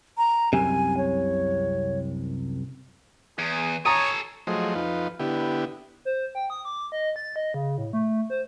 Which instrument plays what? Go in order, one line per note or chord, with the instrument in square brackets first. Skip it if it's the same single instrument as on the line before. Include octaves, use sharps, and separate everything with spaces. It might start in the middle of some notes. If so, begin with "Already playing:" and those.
[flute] A#5
[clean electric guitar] C2 F#2 C3 [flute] G#5
[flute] C#5
[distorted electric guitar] E2 [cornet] G#4
[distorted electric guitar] A4 G#5 [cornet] C#5 [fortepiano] A#5 D#6
[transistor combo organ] F3 F#3 A3 G#4 C5 D#5
F2 D#4 F4 B4
D3 B3 E4 G4
[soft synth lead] C5
G5
D#6
D6
D#5
A6
D#5
C#3
A2
A3
C5